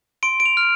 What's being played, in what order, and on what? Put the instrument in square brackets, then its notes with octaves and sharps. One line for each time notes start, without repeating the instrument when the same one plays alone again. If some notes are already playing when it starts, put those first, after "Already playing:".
[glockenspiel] C6 D7
D7
F7
F6